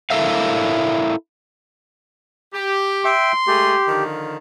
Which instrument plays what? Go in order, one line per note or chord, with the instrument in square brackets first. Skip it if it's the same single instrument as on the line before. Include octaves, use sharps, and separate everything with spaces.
[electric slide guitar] E4 A4 A#4 E5 F5
[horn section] G4
[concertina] E5 G5 [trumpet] C6
[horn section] G#3 A3 G#4 [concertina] G4
[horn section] D3 D#3 F3